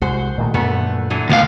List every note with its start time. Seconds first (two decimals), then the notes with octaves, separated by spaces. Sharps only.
0.02 C2 G#3 F#4 C5
0.38 A#2 D#3 A3
0.54 F#2 A#2 D3 A3 B3
1.10 D3 E3 F#3
1.29 D2 A2 F3 B3 F5